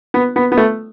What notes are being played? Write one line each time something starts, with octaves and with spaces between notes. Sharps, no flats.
B3
B3
B3
A3